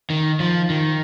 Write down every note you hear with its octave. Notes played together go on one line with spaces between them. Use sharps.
D#3
F3
D#3